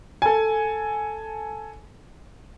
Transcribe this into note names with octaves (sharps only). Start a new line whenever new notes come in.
A4 G#5